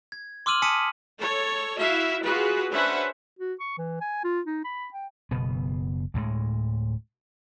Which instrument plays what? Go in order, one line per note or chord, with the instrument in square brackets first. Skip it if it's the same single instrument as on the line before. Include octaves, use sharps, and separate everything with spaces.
[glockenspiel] G#6
C6 D6 E6 F6 D#7 F#7
G#5 A5 D#6 B6 C#7 D#7
[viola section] A4 C#5
E4 F#4 E5 F5
F4 F#4 G#4 B4
C#4 D4 B4 C5 E5 F#5
[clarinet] F#4
C#6
E3
G#5
F4
D#4
B5
G5
[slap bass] F#1 B2 B3
D2 A2 G#3